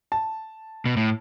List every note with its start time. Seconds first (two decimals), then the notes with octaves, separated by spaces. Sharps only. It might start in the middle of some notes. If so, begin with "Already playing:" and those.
0.12 A5
0.86 B2
0.97 A2